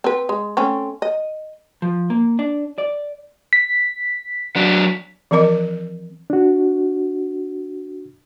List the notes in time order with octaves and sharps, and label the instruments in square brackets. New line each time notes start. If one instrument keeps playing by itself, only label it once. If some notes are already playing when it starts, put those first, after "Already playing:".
[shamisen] C4 B4
G#3
A3 C4 C#4
D#5
[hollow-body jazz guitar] F3
A#3
D4
D5
[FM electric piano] B6
[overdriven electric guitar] F#3 D4
[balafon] E3 F3 C4 A#4 D#5
[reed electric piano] D4 F#4